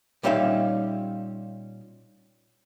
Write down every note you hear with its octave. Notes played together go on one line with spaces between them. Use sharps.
A#2 G3 C#4 D#4 E5 F5